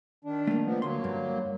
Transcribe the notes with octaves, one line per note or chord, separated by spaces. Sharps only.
D#3 D4
A3 A#3
F3 B3
D2 F#3 A#3 C6
G2